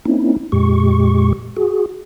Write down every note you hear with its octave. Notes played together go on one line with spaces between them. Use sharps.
A#3 C4 C#4 D#4 E4
F2 A#2 G#3 G4 C#6
F#4 G#4